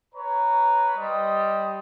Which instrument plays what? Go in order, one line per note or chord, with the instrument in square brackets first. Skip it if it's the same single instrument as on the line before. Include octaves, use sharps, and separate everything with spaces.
[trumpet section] B4 C#5 A#5
G3 C5 D#5 D#6